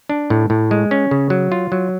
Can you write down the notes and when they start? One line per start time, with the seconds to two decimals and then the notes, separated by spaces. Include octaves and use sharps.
0.09 D4
0.30 A2
0.50 A2
0.71 G#3
0.91 C#4
1.11 C#3
1.30 F#3
1.52 F4
1.72 F#3